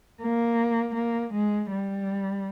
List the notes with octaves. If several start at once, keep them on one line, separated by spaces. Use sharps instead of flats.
A#3
A#3
G#3
G3